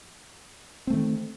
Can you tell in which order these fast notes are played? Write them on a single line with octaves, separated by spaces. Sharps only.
C4 A3 D#3